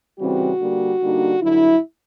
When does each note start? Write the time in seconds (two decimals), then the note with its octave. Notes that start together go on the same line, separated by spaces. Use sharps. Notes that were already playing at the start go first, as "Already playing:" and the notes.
0.18 C#3 E3 G3 C4 F#4
0.59 D3 G3 A#3
1.00 D3 G3 A#3 D#4
1.41 G2 D3 F#3 E4